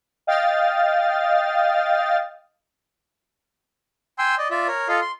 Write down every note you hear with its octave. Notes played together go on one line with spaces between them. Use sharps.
D#5 F5 G5 D#6 F6 A6
G5 G#5 C6 E6
D5 D#5
F4 D5 E5
A#4 C#5
F4 A4 D#5 F5
C6